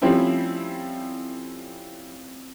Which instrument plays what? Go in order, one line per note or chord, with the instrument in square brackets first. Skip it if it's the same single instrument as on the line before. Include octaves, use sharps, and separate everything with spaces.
[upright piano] F3 G3 A3 C4 C#4 E4